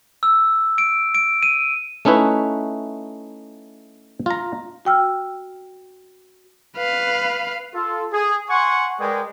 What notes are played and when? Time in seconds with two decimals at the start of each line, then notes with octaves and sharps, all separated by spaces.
0.23 E6
0.78 D7
1.15 D7
1.43 D#7
2.05 A3 C#4 D#4 E4 B4
4.26 F4 A#5
4.85 F#4 G5 E6 F6
6.77 B4 F5
7.74 F4 A4
8.12 G#4
8.49 F#5 G#5 C6 C#6
8.99 G#3 G#4 A#4 B4 D5 G5